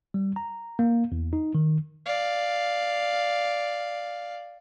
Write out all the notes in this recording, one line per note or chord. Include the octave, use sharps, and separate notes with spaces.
G3
A#5
A#3
E2
D#4
D#3
D5 F5